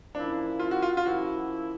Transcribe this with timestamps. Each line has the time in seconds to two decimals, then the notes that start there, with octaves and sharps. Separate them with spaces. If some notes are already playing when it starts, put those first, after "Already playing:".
0.15 F3 A#3 C#4 D4 E4
0.59 F4
0.71 F#4
0.82 F4
0.97 F4
1.05 F3 A#3 C#4 E4 F#4